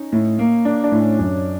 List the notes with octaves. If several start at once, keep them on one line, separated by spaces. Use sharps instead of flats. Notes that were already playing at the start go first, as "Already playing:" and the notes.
Already playing: C#4 D#4
A2
A#3
A#3 D4
D4
A2
C#4
F#2